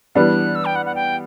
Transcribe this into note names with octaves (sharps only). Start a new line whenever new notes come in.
E3 G3 B3 D4 F#6
E6
G5
F#5
F#5
G5